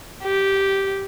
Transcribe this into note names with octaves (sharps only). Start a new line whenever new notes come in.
G4